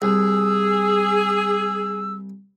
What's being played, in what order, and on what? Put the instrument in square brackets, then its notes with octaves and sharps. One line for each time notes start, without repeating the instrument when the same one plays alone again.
[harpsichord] C2 [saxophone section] G#4 [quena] E6